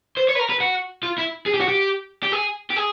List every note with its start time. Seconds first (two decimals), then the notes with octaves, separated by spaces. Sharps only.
0.17 C5
0.28 C#5
0.35 B4
0.39 A#4
0.50 B4
0.60 F#4
1.03 F4
1.18 E4
1.46 G#4
1.54 G4
1.61 F#4
1.69 G4
2.23 G4
2.32 G#4
2.70 G4
2.76 G#4